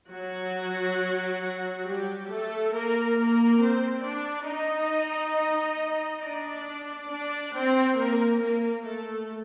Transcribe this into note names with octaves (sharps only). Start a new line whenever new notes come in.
F#3 F#4
G3 G4
A3 A4
A#3 A#4
A#3 A#4
C4 C5
D4 D5
D#4 D#5
D4 D5
D4 D5
C4 C5
A#3 A#4
A#3 A#4
A3 A4